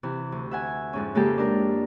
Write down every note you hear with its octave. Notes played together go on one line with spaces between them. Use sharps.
C3 E3
D2
E5 F#5 G#5
F2 G#2 C#4
C#3 G#3 A#3 G4 A4
D4 A#4